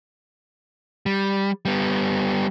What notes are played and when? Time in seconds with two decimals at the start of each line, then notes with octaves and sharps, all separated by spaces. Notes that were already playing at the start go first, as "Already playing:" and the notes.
1.06 G3
1.65 G3 B3